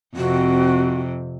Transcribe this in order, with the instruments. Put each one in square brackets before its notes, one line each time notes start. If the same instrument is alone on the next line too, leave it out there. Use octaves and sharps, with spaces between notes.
[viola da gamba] F2 C3 [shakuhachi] F#4